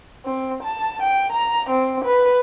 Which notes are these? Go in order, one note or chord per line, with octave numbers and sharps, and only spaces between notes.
C4
A5
G5
A#5
C4
B4